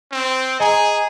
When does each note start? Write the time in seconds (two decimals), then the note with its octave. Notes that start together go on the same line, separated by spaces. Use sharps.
0.12 C4
0.60 G#4 D#5 G#5 A#5